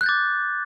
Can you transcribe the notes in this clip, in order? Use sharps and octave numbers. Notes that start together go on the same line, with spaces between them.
D6 F#6 G6 A6